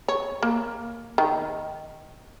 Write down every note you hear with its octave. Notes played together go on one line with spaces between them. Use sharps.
C#5
A#3
D#3